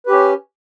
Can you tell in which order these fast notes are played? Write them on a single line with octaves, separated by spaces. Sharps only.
B4 G4 C#4